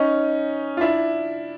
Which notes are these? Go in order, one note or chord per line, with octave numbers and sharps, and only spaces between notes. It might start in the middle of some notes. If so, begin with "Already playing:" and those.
Already playing: C#4 D#4
F4
D4 E4